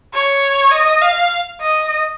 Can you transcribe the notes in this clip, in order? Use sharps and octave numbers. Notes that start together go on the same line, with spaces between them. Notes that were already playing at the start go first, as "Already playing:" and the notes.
C#5
D#5
F5
D#5